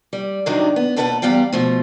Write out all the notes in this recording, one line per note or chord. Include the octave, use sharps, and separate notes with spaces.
G3
G2 C3 D#3 F#3 D4 D#4
B3
D#2 B2 A4 B4 E5 F#5
E2 G3 B3 F5 G5
B2 F3 A3